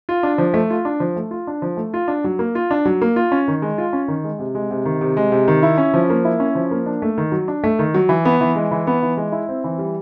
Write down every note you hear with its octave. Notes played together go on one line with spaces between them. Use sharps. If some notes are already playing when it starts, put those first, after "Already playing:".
F4
D4
F3
A3
F4
D4
F3
A3
F4
D4
F3
A3
F4
D4
F#3
A#3
F4
D4
F#3
A#3
F4
C#4
D#3
G#3
F4
C#4
D#3
G#3
C3
G#3
C3
D#3
C3
G#3
C3
D#3
E4
C#4
F3
A#3
E4
C#4
F3
A#3
D4
A3
D#3
F#3
D4
A3
D#3
F#3
E3
B3
E3
G#3
E3
B3
E3
G#3
E4
C4
E3
G3